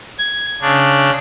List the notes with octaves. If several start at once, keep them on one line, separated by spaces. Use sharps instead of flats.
G#6
C#3 D4